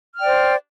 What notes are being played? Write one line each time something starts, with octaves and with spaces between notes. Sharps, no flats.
C5 D5 G5 F6